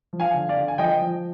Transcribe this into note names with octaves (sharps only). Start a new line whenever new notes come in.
F3
F5 G#5
D3
D5 F5
D3
G#5
F3 D#5 G5
F3